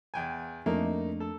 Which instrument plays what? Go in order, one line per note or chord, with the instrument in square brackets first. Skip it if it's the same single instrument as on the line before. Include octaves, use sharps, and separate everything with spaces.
[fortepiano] E2 G5 G#5
[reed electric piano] F2 A3 D4 [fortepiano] A#3 D#4
[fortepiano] A4